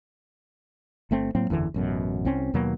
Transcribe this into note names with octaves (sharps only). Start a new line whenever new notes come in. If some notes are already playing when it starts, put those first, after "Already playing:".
G1 A3 C4
A2 F#3 A#3 C4
F#1 E2 D3 E3
A1 F#2 B2
C2 C4 C#4
D#2 B2 F#3 A#3